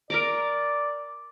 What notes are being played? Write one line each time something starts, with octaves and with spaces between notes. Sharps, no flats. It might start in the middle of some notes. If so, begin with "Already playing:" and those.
A#4 D5 A#5 D6